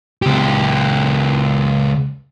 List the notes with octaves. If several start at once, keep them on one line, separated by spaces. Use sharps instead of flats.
C#2 G4